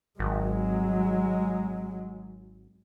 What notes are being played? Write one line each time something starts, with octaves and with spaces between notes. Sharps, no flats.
G#1 F#3 G#3